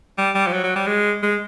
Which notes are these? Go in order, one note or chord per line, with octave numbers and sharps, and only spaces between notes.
G3
G3
F3
F#3
F#3
G3
G#3
G#3